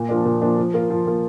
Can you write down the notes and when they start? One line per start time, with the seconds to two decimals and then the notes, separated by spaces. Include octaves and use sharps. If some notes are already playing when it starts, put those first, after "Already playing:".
Already playing: A#2
0.09 F3 A#3 D4
0.25 A#2
0.42 F3 A#3 D4
0.58 F3
0.74 A#3 F4
0.90 F3
1.07 A#3 F4